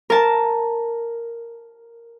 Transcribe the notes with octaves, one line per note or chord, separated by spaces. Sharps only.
A#4 A5